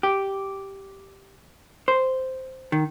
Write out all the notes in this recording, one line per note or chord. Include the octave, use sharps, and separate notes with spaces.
G4
C5
D#3